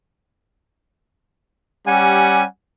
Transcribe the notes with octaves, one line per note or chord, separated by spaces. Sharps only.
G3 C#4 G4 F#5 G#5